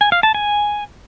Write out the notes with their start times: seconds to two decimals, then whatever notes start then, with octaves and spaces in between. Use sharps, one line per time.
0.01 G#5
0.12 F5
0.23 A5
0.35 G#5